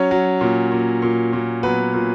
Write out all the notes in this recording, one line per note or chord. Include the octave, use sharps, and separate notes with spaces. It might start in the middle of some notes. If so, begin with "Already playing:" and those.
Already playing: F#3 C#4 C#5
F#3
A#2
A#2
A#2
A#2
F#3 B3 B4
A#2